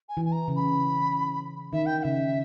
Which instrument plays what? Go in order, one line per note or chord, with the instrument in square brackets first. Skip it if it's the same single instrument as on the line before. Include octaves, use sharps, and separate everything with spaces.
[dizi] G#5
[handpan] E3
[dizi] G#5
A#5
[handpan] C#3
[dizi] B5
[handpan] D#3 [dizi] E5
[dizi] G5
G5
[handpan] C#3 [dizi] E5